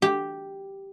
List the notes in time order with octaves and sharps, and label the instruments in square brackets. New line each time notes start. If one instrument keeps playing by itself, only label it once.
[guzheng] G4